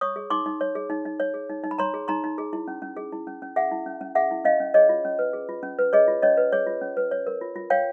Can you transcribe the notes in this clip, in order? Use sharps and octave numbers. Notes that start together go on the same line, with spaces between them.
C#5 C#6 D#6
G#4
D#4 C6 D6
D#4
C#5
G#4
D#4
D#4
C#5
G#4
D#4
D#4
B5
C#5 A#5 C6
G#4
D#4 A#5 C6
D#4
G#4
E4
C#4
C#4
G#4
E4
C#4
C#4
G#4 E5 F#5
E4
C#4
C#4
G#4 E5 F#5
E4
C#4 D#5 F5
C#4
G#4 C#5 D#5
F4
C#4
B4
G#4
F4
C#4
B4
G#4 C#5 D#5
F4
C#4 C#5 D#5
B4
G#4 C#5
F4
C#4
B4
C#5
A#4
F4
F4
C#5 F5 G5